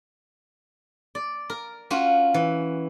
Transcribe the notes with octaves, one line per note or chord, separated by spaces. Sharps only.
D5
A#4
C#4 F4 F#4
E3